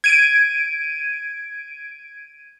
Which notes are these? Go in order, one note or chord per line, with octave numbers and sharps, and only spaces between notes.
G#6 D7 D#7